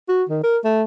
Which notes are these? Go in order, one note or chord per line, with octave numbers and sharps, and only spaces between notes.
F#4
D#3
A#4
A3